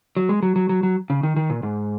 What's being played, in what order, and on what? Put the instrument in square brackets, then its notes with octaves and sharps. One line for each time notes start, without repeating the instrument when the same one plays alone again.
[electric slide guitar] F#3
G#3
F#3
F#3
F#3
F#3
C#3
D#3
D#3
A#2
G#2